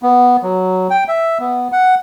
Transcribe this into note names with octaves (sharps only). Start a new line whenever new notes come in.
B3
F#3
G5
E5
B3
F#5